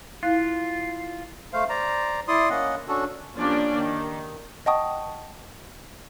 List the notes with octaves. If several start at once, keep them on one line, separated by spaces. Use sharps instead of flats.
E4 F4 F5 F#6
A3 C5 F5
C5 D5 A#5
E4 D5 C6 D#6
A#3 C#4 D#5 F#5
C#4 D4 F#4 A4
F3 A#3 C#4 D4 G4 D5
D#3
D#5 F#5 G5 A5 C#6 D#6